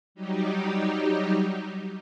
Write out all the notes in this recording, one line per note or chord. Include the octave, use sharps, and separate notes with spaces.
F#3 G3 D#4 G4